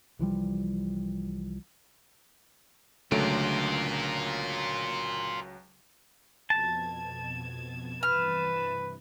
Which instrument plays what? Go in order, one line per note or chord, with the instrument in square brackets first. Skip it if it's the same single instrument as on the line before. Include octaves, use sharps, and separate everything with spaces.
[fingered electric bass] C2 E3 F3 G3
[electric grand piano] C#2 F#3 D7 [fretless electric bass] D3 A3 [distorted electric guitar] F4 A#4
[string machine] F2 B2 G#6 [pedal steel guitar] A5
[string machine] G2 C3 E3 [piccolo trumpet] B4 [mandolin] F6